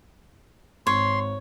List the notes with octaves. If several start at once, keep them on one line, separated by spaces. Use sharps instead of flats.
G#1 C#5 C6